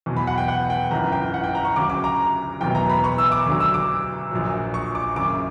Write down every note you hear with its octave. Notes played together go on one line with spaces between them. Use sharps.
E2 B2 F#3
B5
F#5
G5
F#5
G5
G1 F#2 E3 A#5
G5
F#5
G5
A#5
C#6
D2 C#3 F#3 D6
D6
A#5
F#1 E2 B2 F#3 G5
A#5
B5
C#6
E6
D6
D2 D3 F#3
E6
D6
A#1 A#2 F#3
C#6
D6
F#1 F#2 C#3 D6